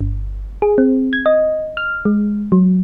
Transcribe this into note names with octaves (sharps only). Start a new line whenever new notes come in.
G1
G#4
C4
G#6
D#5
F6
G#3
F#3